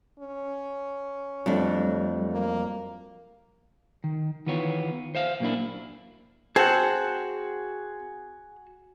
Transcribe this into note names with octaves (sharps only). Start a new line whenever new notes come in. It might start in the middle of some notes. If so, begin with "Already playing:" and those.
C#4
F2 F#3 G3 A3 D4
A#3
D#3
D#3 E3 B3 F4 C#5
C5 E5 F5
A#2 F#3 A#3 D4 E4
C4 F#4 G#4 F#5 A5